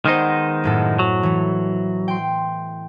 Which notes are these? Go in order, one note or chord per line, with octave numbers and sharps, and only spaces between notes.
D#3 G#3 B3 D#4 C5 D#5
F#2 A2 A4
F#3
E3 A3
G5 C6